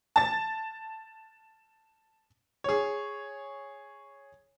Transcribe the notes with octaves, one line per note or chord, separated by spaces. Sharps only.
A5 A6
G#4 C#5